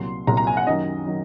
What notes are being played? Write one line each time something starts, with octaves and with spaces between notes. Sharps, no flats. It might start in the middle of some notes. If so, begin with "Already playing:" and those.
Already playing: C2 A#2 F#3 C6
C2 A#2 F#3 A#5
A#5
G#5
F#5
F#2 D#3 F#3 D#5
D#3 F#3